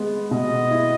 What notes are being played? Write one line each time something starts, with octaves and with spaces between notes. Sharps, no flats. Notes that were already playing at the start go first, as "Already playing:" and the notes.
Already playing: G#3 B3
B2 D#5
E4